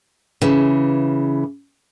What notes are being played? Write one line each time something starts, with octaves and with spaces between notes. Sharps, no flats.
C#3 E3